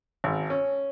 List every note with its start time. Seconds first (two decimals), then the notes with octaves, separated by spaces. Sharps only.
0.24 G#1
0.50 C#4